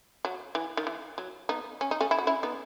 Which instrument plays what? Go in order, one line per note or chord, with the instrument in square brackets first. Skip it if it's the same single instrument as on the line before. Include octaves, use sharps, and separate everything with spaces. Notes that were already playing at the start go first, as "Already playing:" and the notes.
[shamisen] F#3
E3
D#3
E3
F#3
B3 D#4
C#4
D#4
A3 C#4
E4
F#4
C#4 E4
B3 D#4